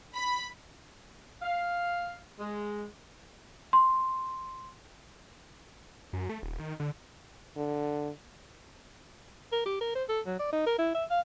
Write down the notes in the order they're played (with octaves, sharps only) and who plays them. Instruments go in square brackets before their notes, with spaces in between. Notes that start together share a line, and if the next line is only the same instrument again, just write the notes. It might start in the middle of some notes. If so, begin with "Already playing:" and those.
[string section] B5
[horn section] F5
G#3
[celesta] C6
[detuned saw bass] F#2
A3
D#1
D#3
D3
[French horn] D3
[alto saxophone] A#4
G4
A#4
C5
A4
F#3
D5
D#4
A#4
E4
E5
F5